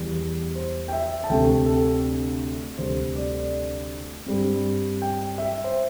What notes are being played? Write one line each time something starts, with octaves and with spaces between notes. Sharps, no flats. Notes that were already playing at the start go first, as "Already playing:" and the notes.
Already playing: E2 E3 G3
C5
G5
E5
A5
D2 C3 A3 G5
A4
D2 C3 G3 C5
D5
G2 G3 C4
G5
E5
C5